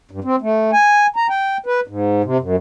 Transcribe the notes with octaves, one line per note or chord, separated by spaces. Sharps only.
G2
C4
A3
G#5
A#5
G5
B4
G#2
C3
F#2